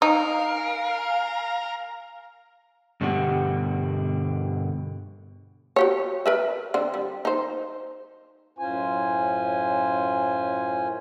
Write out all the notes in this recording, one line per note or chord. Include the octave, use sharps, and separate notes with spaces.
D#4 A#4 F5 G#5 F6
G2 B2 D3 F#4 G4
F#4 G4 C#5
A#4 B4 E5
D3 C4
G3
D#4 C5
F#2 A2 C#4 F4 C5 G#5